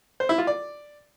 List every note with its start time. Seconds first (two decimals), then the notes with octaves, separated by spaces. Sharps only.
0.20 C5
0.29 E4
0.38 F4
0.47 D5